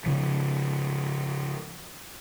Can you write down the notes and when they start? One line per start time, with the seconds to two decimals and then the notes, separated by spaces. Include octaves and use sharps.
0.06 C#3 F3